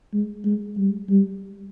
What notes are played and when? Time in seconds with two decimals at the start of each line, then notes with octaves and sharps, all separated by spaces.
0.14 G#3
0.45 G#3
0.77 G3
1.09 G3